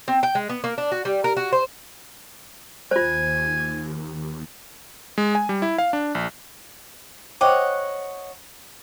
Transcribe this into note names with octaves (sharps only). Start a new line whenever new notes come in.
C4
G5
G#3
B3
A#3
D4
F#4
G3
A#4
F#4
C5
D#2 F4 C5 G#5
G#3
G#5
G3
E4
F5
D4
A#1
C5 C#5 D#5 F#5 G5 D6